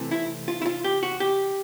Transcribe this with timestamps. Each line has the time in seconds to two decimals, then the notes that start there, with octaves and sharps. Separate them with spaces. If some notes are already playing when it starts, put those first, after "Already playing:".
Already playing: C3 E3 A3
0.11 E4
0.48 F4
0.62 E4
0.65 F4
0.84 G4
1.03 F#4
1.20 G4